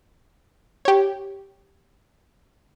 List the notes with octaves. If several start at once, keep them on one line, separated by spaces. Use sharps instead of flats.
G4 C#5